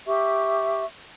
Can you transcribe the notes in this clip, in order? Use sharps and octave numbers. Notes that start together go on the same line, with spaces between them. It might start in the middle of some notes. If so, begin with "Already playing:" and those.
G4 E5 C#6